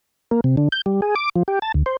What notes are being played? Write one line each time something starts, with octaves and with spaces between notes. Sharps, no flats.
A#3
C3
D3
G6
G3
G#4
D6
F3
G4
A5
D2
C5